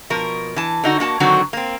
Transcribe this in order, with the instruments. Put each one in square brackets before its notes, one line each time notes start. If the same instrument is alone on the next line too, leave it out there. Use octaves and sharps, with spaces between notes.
[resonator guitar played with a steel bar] B2 F3 A#4
E3 A5
D3 D#4 F#4
A#3 F#4 A5
D3 D#3 F#3 C4 F#4
A#3 C4